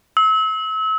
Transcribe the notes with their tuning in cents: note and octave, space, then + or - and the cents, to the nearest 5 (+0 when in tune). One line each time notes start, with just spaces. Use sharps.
E6 -35